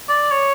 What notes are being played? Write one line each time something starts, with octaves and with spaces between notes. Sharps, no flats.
D5
C#5